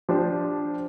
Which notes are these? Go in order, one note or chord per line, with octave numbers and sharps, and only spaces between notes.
F3 D4 G4 C5